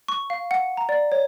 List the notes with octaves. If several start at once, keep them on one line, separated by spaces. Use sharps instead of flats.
C#6
F5
F#5
A#5
D5
C#5